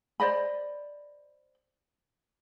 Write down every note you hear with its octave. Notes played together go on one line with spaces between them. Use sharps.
C5 D5 D#5 B5